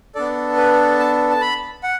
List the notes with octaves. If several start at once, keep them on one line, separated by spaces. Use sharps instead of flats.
B3 D4 A4 D5
B4
A5
A5
B5
F#5